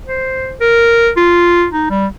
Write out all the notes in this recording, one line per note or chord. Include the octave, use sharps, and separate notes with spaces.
C5
A#4
F4
D#4
G3